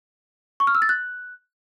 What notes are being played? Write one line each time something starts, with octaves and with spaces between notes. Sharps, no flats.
C#6
F6
E6
A6
F#6